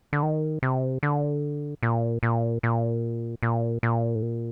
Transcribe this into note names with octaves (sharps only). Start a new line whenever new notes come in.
D3
D#3
C3
D3
A#2
A#2
A#2
A#2
A#2
A2
A#2